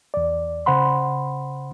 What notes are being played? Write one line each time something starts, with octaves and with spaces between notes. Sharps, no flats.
E2 D5
C#3 C5 F#5 B5 C6